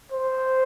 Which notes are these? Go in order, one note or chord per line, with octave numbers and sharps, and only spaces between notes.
C5